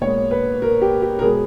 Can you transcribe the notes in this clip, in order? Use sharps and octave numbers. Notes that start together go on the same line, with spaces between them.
A#2 G#3 B3 C#5
B4
A#4
G4
G4
A#4
B2 G#3 B3 G#4